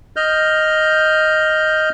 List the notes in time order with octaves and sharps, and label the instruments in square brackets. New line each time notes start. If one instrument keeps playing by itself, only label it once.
[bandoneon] D#5 F6 G6